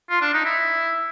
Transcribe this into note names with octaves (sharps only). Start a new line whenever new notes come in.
F4
D4
D#4
E4